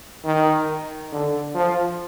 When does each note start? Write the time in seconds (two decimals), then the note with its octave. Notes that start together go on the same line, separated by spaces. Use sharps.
0.25 D#3
1.12 D3
1.54 F3